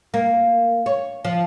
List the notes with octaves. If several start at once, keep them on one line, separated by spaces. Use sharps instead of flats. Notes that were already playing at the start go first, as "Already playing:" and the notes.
A#3
C#5
F3